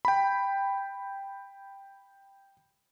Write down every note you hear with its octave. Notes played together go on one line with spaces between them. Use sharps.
G5 B5